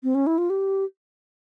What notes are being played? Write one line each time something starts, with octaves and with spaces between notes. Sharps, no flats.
C4
C#4
E4
F4
G4